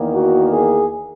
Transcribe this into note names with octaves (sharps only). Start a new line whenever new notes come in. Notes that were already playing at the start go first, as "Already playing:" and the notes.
Already playing: E2 D#3 A#3
F#4
G#4